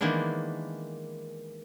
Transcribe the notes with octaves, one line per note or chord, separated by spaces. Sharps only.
D#3 E3 G#3 A#3 B3 D4